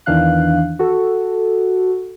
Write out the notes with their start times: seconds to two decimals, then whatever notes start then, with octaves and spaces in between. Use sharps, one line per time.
0.06 E2 D#3 E3 D4 F5 F#6
0.79 F#4 A4